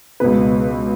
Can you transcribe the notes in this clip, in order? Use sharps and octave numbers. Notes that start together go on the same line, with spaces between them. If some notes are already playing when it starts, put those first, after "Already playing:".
C#2 B2 B4